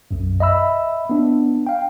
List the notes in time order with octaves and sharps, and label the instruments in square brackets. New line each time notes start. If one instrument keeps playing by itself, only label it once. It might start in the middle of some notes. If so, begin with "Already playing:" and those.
[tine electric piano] B1 F#2
D#5 E5 B5 E6
B3 D4
F5 G5